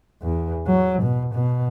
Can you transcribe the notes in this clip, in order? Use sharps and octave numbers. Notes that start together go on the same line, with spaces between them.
E2
F#3
B2
B2